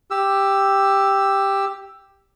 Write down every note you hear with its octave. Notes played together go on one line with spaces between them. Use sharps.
G4 E6